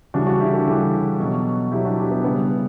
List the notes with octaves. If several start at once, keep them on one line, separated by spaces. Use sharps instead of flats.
C#3 E3 G3 D4 F#4
D4 F#4
E4 G4
F#4 A4
C#3 E3 G3
B2 F#3
B2 F#3 E4 G4
D4 F#4
E4 G4
B3 D4
C#3 G3 B3